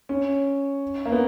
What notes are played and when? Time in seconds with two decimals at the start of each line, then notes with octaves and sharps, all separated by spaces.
0.09 C#4
1.06 A#3
1.12 B3